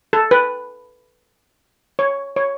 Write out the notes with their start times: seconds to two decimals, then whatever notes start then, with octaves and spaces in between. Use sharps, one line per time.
0.13 A4
0.31 B4
1.99 C#5
2.36 C#5